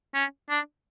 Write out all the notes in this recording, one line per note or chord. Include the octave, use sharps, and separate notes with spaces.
C#4
D4